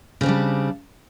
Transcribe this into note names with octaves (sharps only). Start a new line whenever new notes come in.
C#3 G3 C4 D4